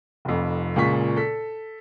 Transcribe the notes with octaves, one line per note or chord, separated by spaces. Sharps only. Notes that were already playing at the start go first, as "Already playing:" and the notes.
F1 F2
C#2 A#2 G#4 C#6 B6
A4 B6